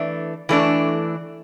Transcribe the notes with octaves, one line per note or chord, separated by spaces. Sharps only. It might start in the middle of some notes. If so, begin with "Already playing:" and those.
Already playing: E3 A3 D4
E3 A3 D4